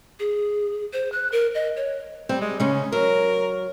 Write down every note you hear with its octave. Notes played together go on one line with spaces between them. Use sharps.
G#4
C5
F#6
A#4
D#5
C#5
G3 C4
G#3
C#3 G#3 C#4
F#3 A#4